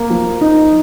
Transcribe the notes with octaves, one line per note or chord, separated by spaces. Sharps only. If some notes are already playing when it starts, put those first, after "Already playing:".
Already playing: A#3
F3
D#4